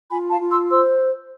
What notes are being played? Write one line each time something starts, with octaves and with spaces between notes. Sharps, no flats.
F4 G#5 B5
F5 A5
F4
C6 E6
C5 C6 E6